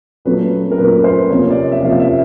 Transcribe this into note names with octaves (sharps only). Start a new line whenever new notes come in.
A#2 F#3 A3 C#4 B4
A#4
A#2 F#3 A3 C#4 B4
B4
C5
C3 F3 A#3 C#4 C#5
D5
D#5
E5
C3 F3 A#3 C#4 F5
E5